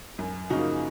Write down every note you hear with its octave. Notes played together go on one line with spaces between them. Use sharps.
F#2
C#3 F3 A#3 D#4 F#4